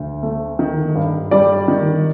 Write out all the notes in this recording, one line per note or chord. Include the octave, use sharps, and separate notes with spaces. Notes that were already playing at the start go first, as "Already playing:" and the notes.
Already playing: D2
A3
D#3
G2
G3 D5
D#3